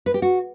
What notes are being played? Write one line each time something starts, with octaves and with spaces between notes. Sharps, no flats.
B4
G4
F#4